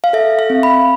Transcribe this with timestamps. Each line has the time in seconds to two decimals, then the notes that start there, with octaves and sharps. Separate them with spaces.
0.04 F5
0.13 A4 E5
0.39 F5
0.50 C4
0.63 B5